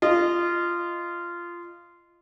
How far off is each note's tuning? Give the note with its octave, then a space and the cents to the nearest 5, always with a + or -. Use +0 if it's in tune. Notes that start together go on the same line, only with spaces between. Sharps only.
F4 -15 D#5 -15